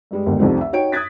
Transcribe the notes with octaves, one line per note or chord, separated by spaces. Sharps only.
G2 G3 G#3
G1 D#2 G#2 D3
C2 F2 D#3 A3 C4
E5
D#4 F#4 C#5 G5 D7
D#6 F#6 G#6 A6 B6